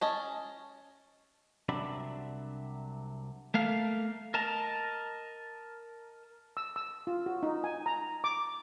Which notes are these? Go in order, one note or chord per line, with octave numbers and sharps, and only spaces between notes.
C#4 D#5 A5
C2 C3 F#3 D4 E5 B5
A3 A#3 F5
A#4 D#5 A5 A#5
E6
E6
F4
F#4
D#4
G#5
A#5
D6